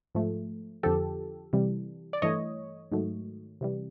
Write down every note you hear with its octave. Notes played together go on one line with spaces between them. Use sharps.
G#2 F3 A3
F2 D3 F3 G4 A4
C3 E3 G3
D5
G2 E3 A3 C#5 D#5
G#2 D#3 F#3 A3
C3 E3 G3